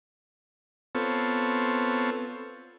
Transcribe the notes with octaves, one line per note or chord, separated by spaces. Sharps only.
B3 C4 F4 A4 C#5